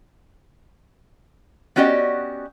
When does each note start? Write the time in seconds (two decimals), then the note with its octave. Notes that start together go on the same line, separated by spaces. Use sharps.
1.76 B3 C#4 F#4 G4 D5 D#5